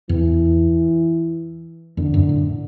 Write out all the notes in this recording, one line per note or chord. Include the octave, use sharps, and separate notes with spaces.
E2 E3
E2 D3
F#2
A2